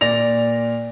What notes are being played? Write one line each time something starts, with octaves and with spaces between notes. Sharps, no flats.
A#2 D5 A#6 F7